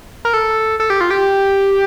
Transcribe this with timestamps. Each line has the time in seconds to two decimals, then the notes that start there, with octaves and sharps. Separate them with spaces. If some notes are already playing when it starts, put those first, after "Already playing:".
0.25 A#4
0.34 A4
0.80 A4
0.90 G4
1.01 F4
1.10 G4